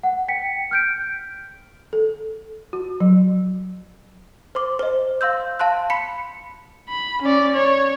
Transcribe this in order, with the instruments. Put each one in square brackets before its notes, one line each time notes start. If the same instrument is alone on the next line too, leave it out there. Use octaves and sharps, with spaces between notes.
[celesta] F#5
G5 B6 C#7
F6 G6 D7
[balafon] A4
F#4
F#3
[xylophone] C5 C6 D6
C5 D#5
F5 C6 E6 G6
F5 A5 C6 F#6
B5 B6 C#7
[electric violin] B5
C#4 D5
C#5